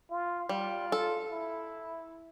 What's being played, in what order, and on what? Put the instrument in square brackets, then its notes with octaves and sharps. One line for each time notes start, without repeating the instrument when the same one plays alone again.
[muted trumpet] F4
[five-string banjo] G3 [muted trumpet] F4
[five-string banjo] A4
[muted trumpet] E4